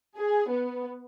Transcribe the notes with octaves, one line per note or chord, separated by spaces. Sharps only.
G#4
B3